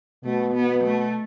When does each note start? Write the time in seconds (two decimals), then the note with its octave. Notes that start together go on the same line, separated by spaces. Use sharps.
0.24 B2 A3
0.54 B3
0.84 A3